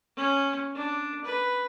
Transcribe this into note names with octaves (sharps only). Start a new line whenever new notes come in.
C#4
D4
B4